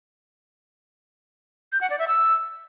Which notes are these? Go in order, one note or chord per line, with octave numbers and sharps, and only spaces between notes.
G6
F#5
D5
E5
E6